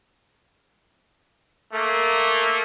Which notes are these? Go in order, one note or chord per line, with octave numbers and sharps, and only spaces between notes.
A3 A#3